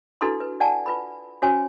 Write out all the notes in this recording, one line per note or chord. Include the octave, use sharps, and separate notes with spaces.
D4 E4 F#4 A4 B4 C6
B4
D5 F#5 G#5 A5
F4 B4 B5
C#4 F#4 C5 C#5 G#5